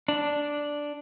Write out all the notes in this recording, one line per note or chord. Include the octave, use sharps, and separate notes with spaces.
D4